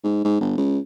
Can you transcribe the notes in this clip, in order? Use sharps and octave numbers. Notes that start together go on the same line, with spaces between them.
G#2
G#2
G1
C#2